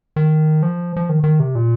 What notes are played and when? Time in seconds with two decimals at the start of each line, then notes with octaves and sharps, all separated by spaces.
0.16 D#3
0.63 F3
0.96 F3
1.09 D#3
1.24 D#3
1.40 C3
1.55 A#2